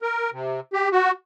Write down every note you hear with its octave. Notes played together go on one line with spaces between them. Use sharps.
A#4
C3
G4
F#4